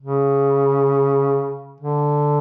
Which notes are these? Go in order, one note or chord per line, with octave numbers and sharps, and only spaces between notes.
C#3
D3